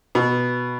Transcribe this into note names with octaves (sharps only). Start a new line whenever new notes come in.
B2